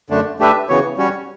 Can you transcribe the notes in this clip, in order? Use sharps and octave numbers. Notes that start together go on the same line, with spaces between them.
F#2 D3 A3 D4
A3 D4 G4 B4 E5
C#3 E3 B3 F#4 C#5
G3 C#4 F#4 C#5